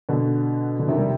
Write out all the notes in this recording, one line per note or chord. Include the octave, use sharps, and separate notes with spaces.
B2 D3
D3
C3 D#3
G3